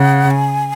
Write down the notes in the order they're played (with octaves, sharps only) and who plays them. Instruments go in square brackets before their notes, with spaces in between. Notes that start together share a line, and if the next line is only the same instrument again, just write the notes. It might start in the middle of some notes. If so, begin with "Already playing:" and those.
Already playing: [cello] C#3 [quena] F#5
[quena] G#5